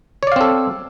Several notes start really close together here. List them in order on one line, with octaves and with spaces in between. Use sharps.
C#5 D5 F5 C4 A4